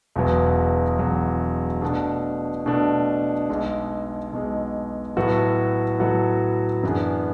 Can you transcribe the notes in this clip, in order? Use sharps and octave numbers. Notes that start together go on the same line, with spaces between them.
E1 E2 B2 F#3 B3
E1 E2 B2 F#3 B3
B2 A3 D4
B2 A3 D4
B1 B2 G#3
B1 B2 G#3
A2 F#3 B3 F#4 A4
A2 F#3 B3 F#4 A4
F#2 E3 B3 D4 G#4